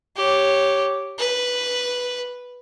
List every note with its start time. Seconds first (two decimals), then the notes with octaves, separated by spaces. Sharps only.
0.17 G4 C#5
1.18 B4